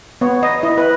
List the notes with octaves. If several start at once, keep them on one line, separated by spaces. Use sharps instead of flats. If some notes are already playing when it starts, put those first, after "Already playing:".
B3 C#5
D#5
E4 D#5
B4